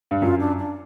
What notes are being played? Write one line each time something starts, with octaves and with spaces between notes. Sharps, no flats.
G2
F#2 F4
D4
D4